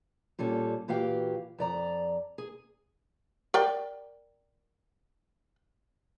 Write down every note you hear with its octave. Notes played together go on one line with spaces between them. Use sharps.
A#2 G3 C#4 A4
A#2 E3 F#4 G4 F5 G5
F2 D5 A#5
G#4
A#4 D5 G5